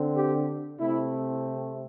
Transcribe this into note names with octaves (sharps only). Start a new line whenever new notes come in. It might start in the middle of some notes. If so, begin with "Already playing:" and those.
Already playing: D3 C4
G4
C3 A3 C4 E4